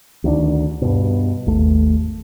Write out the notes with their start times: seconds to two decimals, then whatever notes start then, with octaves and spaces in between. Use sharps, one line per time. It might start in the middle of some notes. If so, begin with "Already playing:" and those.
0.24 D2 D#3 C#4 D4
0.82 G2 B2
1.46 G#1 D#2 A3